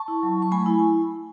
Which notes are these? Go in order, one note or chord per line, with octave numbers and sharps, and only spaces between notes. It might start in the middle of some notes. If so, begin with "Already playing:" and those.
Already playing: A5 C#6
E4
F#3
F#3
C#6
A3 G#5 B5
E4